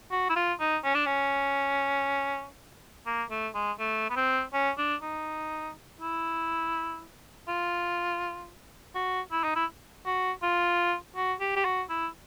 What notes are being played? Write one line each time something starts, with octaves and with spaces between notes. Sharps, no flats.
F#4
E4
F4
D#4
C#4
D4
C#4
A#3
A3
G#3
A3
B3
C4
C#4
D4
D#4
E4
F4
F#4
E4
D#4
E4
F#4
F4
F#4
G4
G4
F#4
E4